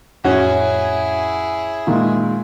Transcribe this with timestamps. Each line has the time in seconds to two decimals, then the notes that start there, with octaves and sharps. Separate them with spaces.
0.24 F2 A2 C#4 E4 F#4 G#4
1.87 A#2 D#3 G#3